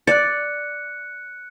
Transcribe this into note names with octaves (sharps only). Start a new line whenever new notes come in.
D5 F#6 C#7